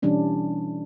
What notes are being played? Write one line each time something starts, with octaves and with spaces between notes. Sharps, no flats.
B2 E3 G3 C#4 D4 E4